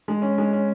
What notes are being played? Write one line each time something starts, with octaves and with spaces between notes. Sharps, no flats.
G#3
C#4
G#3
C#4